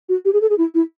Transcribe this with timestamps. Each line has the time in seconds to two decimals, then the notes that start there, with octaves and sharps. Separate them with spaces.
0.09 F#4
0.25 G4
0.33 G#4
0.41 A4
0.50 G#4
0.58 E4
0.74 E4